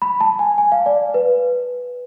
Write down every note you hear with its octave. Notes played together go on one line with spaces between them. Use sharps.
B5
A5
G#5
G#5
F5
D5
B4